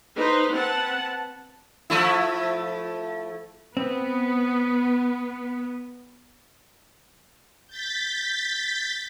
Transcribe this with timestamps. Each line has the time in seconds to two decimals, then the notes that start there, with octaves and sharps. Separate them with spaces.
0.17 D#4 B4 C5
0.53 C4 B4 F#5 A5
1.90 F3 A3 E4
3.77 B3 C4
7.67 G6 A6 B6